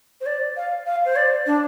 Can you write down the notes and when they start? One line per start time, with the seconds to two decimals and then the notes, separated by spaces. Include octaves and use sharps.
0.21 C5
0.26 D5
0.57 F5
0.87 F5
1.05 C5
1.16 D5
1.46 D4